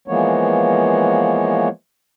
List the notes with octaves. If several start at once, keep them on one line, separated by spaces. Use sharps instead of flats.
E3 F3 G#3 A#3 B3 C#5